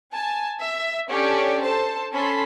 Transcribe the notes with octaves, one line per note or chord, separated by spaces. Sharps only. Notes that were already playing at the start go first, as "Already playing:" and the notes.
G#5 A5
E5
C#4 D4 G4 A4 C#5 D5
A4 C5 A5
C#4 A4 A5 B5 C6